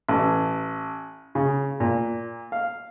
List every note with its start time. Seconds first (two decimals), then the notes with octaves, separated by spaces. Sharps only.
0.09 A1
1.35 C#3
1.80 A#2
2.52 F5